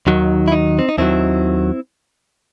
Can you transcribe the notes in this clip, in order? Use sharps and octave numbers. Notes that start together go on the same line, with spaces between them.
D#2 D#3 F#3
E4
D#4
C4
D#4
D#2 D#3 F#3 C4 E4